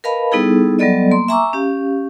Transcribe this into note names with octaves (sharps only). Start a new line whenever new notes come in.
A#4 B4 D#5 F5 A5 B5
G3 B3 D#4 E4 G#4 A4
F#3 G3 B3 A4 D5 D#5
A#3 C6
E5 G#5 A#5 C#6 D6 E6
C#4 G4 F5